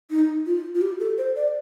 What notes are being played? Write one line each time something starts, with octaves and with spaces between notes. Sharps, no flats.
D#4
F4
F4
G4
A4
C5
D5